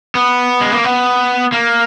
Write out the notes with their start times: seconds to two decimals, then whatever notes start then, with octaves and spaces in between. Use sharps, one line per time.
0.15 B3
0.61 G#3
0.72 A#3
0.84 B3
1.52 A#3